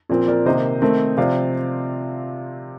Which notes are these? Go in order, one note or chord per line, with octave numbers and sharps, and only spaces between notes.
A#2 F3 C4
A#4 D5
C3 D#3 A#3 C5 D#5
D#3 A3 C4
C3 F3 C4 D5 F5